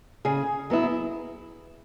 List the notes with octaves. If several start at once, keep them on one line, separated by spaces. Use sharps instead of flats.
C#3 G#4
F#3 B3 E4